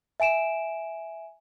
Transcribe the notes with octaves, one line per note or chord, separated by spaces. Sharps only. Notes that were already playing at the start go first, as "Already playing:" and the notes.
E5 G#5 D7 E7